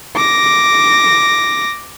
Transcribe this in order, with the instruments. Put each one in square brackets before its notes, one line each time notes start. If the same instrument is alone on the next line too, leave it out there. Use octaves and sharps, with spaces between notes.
[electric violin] D6 A#6